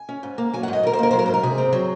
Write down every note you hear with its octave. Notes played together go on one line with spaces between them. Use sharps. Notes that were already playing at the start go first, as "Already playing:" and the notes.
Already playing: G#5
C#4
G#2
A#3
F#3 G#5
F#5
G#2
D#5
G#2 A#4
C5
A#3 A#4
F#3 C5
A#4
G#2 C5
A#4
C3 G#4
C4
F#3